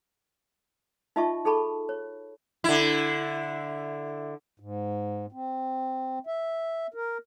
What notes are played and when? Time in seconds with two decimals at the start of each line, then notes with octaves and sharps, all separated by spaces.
1.16 D#4 F4 D#5 E5 A5 C#6
1.45 D#4 G#4 A4 A5 B5 C#6
1.89 C#5
2.64 D3 E4
4.60 G#2
5.32 C4
6.27 E5
6.94 A#4